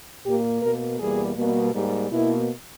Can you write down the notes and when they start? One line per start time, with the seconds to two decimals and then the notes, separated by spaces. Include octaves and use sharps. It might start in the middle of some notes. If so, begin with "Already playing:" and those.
0.25 A#2 A#3 G4
0.62 B2 A#3 A#4
0.99 E2 B2 G3 A#3 G#4
1.37 B2 G3 A#3
1.74 G#2 G3 A#3 G4
2.11 B2 A#3 E4